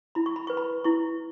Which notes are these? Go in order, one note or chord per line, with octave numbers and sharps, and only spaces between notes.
E4 B5
C#6
B5
B4 C#6
B5
E4 C#6